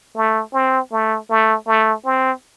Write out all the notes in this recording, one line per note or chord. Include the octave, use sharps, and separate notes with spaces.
A3
C4
A3
A3
A3
C4